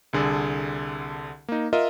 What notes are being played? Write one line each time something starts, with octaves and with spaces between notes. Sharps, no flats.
C2 D3 G#4 A4
A#3 D#4
F4 A#4 D#5 E5